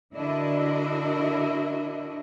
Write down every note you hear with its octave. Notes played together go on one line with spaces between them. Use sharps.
D3 D4 E4 F#4 A#4 D#5